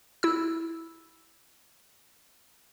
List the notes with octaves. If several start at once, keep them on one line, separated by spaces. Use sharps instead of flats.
E4 E6